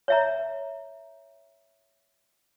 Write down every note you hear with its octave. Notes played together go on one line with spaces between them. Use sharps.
C#5 E5 A#5